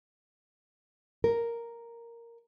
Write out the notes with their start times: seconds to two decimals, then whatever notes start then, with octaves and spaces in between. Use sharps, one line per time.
1.24 A#4